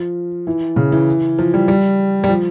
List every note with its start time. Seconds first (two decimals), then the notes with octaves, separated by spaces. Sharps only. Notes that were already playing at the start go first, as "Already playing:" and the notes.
Already playing: F3
0.47 E3
0.76 C#3
0.92 E3
1.39 F3
1.54 G3
1.68 G3
2.24 G3
2.29 F3